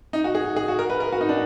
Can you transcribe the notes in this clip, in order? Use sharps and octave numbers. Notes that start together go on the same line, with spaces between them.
D#4
F#4
G#4
G#4
F#4
A#4
B4
A#4
F#4
D#4
D4